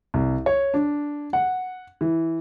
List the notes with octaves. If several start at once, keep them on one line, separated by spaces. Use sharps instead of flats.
C2
C#5
D4
F#5
E3